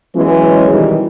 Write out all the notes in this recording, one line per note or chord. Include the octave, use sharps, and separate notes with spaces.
E3 F#3 G#3 B3 C#4
B2 D#3 E3 G3 D#4